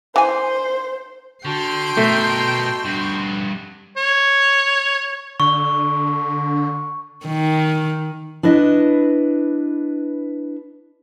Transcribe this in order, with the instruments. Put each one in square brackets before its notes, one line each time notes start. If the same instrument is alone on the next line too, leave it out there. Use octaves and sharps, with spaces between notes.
[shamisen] E3 G#5 [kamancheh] C5
[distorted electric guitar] D3 [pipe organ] F#4 A5 [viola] G5 C6
[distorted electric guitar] B2 A#4 [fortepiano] A3
[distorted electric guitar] G2 F#4
[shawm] C#5
[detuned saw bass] D3 [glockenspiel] C#6
[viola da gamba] D#3
[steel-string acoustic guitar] D4 E4 B4 D#5